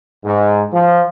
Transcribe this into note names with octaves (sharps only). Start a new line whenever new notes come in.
G#2
F3